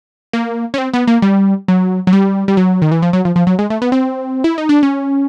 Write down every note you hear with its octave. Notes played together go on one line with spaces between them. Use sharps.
A#3
C#4
C4
B3
A#3
G3
F#3
F#3
G3
G3
F#3
D#3
E3
F3
F#3
F3
F3
F#3
G#3
A3
B3
C4
E4
D#4
D4
C#4